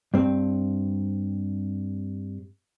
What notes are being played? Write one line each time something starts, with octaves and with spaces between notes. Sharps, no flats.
G2 C4